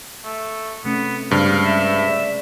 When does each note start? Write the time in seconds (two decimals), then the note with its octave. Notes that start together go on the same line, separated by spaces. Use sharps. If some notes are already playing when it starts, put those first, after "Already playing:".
0.25 A3
0.84 C3 A3 B3 C#4
1.31 G2 C#3 G#3 C5 F5
1.65 E5
2.08 D5